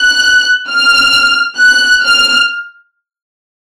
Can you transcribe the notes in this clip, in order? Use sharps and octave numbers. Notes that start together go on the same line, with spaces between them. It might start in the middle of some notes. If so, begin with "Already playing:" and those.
Already playing: F#6
F6
F#6
F6